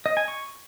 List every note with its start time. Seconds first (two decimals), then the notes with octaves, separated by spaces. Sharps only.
0.06 D#5
0.17 G#5
0.28 C#6